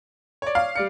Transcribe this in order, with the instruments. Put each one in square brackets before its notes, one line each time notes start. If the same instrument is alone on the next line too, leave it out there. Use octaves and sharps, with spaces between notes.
[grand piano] C#5 D5
[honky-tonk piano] F5
[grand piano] G3 D5 C#7